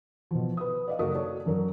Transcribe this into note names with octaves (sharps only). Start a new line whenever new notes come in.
B2 F3
B4 D#6
D5 D#5 F5
F#1 F#4 A4 A#4 D#6
A4 C#5 D5
F#2 F#3 A#4